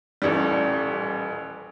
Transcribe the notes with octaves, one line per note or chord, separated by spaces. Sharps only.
D#1 A1 G3